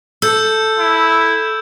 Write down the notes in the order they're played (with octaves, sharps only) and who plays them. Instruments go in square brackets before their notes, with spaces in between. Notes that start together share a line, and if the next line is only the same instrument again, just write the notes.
[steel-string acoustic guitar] A4 [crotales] E6 G6
[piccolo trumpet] E4